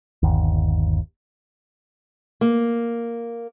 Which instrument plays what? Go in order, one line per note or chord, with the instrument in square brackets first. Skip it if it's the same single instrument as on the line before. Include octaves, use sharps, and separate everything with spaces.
[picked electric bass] G1 D#2
[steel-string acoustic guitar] A#3